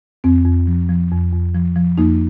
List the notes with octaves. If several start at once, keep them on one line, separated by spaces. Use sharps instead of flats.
F2 C4
F2
F3
F3
F2
F2
F3
F3
F2 A#3 D#4